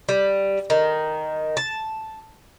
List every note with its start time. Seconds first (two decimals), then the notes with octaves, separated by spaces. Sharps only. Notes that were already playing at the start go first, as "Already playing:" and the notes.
0.09 G3
0.70 D#3
1.57 A5